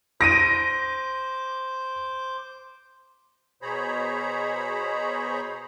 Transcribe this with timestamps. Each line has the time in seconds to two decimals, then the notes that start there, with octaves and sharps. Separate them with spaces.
0.21 C5 D6 A#6 D7 D#7
3.62 B2 G#4 C5 C#5 A#5 B5